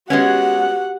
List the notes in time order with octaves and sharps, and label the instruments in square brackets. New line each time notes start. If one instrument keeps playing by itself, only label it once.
[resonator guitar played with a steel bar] G#3 B3 C#4 [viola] F#4 G4 [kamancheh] F#5